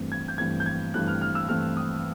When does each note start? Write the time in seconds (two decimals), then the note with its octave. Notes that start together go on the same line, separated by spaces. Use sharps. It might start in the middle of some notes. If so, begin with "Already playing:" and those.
Already playing: G2 E3 A3 C4
0.12 G#6
0.28 G6
0.38 G2 E3 A3 C4 G#6
0.60 G6
0.66 G#6
0.94 G2 E3 A3 C4 F#6
1.08 F6
1.21 F6
1.35 E6
1.48 G2 E3 A3 C4 F6
1.77 D#6